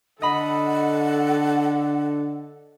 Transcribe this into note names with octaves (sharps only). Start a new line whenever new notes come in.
D3 A4 D#5 F#5 B5